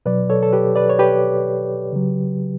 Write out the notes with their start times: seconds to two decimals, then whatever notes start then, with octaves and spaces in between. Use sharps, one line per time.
0.06 B2 F#3 B4 D5
0.30 A4 C#5
0.43 A4
0.53 G4 B4
0.76 B4 D5
0.89 C#5
0.99 G4 B4
1.93 C#3 F#3